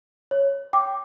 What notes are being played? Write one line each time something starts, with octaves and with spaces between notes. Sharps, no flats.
C#5
G5 D6